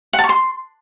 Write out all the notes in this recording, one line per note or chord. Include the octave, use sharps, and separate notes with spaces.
F#5
A5
C#6
C6